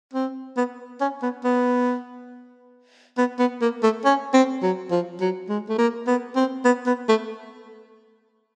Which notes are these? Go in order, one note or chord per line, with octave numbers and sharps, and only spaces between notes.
C4
B3
C#4
B3
B3
B3
B3
A#3
A3
C#4
C4
F#3
F3
F#3
G#3
A3
A#3
B3
C4
B3
B3
A3